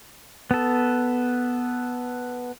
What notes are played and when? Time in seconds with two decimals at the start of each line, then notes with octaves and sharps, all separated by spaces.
0.51 B3 A4